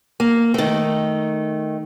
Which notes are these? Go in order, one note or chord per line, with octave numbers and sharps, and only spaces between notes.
A#3
D#3 A3